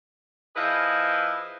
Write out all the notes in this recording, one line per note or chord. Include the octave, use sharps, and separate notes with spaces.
F3 E4 G#4 B4 D#5